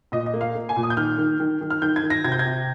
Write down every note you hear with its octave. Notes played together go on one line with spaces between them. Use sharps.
A#2 D#5
D#5
A#3
F5
A#3
G#5
A#2
D#6
G6
D#3 F6
D#3
D#3
D#3
F6
D#3 G6
G#6
D#3
A#6
C3 G#6
G6
G#6
C3